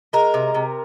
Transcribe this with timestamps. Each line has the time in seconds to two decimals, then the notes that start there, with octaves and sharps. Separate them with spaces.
0.13 G#3 A#4
0.34 C3
0.54 C3